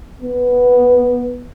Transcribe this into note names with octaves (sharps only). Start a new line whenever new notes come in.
B3